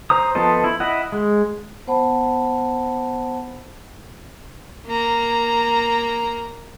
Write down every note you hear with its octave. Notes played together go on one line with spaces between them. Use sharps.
C5 A#5 D#6
F3 B3 A4 C5 D#5
E4
E4 D#5 F#5
G#3
B3 C5 F#5 A5 B5
A#3 A#5